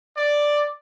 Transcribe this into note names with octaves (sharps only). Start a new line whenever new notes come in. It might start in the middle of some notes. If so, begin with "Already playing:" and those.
D5